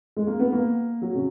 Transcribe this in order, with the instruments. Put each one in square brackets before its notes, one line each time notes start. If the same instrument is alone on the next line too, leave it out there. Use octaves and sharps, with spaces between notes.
[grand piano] G#3
A#3
B3
A#3
F#3
C#3